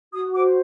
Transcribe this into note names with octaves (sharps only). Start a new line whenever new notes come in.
F#4 D#6
C5 D6